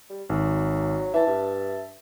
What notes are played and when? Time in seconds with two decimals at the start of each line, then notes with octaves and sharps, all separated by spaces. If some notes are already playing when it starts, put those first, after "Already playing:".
0.10 G3
0.29 G#1 F#3
1.14 E3 E5 A5
1.27 G2